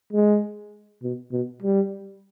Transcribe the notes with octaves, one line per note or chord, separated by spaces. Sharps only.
G#3
B2
B2
G3